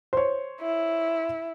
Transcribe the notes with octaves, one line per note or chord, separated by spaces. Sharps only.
C5 C#5
E4